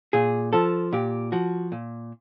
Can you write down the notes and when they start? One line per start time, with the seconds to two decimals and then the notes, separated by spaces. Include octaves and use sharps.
0.13 A#2 G#4
0.53 F3 A4
0.93 A#2 G4
1.32 F3 F#4
1.72 A#2